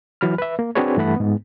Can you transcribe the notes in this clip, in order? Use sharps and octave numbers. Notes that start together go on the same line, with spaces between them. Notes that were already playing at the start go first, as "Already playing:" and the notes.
E3 F#3 B5 F6
B4 E5
A#3
C4 D4 F#4 G#4 B4 C#5
G2 E3 A3 F#5 B5
G#2 B3